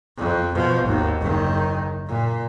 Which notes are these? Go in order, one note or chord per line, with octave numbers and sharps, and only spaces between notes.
F2
B2 F3
G#1 D#2
F#1 D#3
A#2